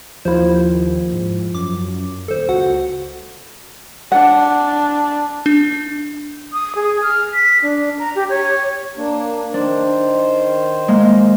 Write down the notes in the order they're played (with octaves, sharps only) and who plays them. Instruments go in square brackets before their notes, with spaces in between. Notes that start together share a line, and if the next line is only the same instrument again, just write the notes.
[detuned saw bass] D#2 [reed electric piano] F3 F4 [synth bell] E4 C5
[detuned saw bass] G#2
[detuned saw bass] F#2 [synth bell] D6
[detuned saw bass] D#1 [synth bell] A4 C5
[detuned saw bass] C#2 [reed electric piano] F#4 [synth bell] F#5
[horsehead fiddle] D4 [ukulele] F#5
[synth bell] D4
[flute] D#6
G#4
F6
B6
D4
A#5
G4
C#5
[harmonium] A#3 D4
[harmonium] D#3 C5 [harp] D4
[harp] G#3 A#3